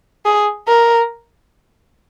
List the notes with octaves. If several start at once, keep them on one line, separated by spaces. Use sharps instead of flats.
G#4
A#4